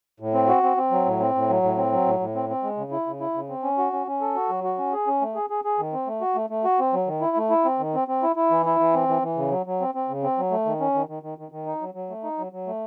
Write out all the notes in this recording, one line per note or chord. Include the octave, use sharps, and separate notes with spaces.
A2
C4
F#4
C4
C4
F#3
A2
C4
A2
F#3
A2
C4
F#3
A2
A2
C4
C4
G#3
C#3
E4
C#3
E4
C#3
C4
C#4
F#4
C#4
C#4
A4
F#4
F#3
F#4
C#4
G#4
C#4
A3
G#4
G#4
G#4
D#3
C4
A3
F#4
A3
A3
F#4
C4
F#3
D#3
E4
A3
E4
C4
D#3
C4
C4
E4
E4
E3
E4
E3
C4
E3
E3
C#3
F#3
F#3
C4
C4
C#3
C4
F#3
A3
D#3
C#4
D#3
D#3
D#3
D#3
D#3
D#4
F#3
F#3
A3
D#4
F#3
F#3
A3